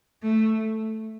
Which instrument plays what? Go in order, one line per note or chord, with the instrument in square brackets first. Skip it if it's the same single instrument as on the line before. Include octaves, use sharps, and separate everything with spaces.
[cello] A3